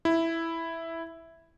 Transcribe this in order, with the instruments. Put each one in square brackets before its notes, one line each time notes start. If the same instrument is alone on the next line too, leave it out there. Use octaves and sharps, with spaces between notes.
[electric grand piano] E4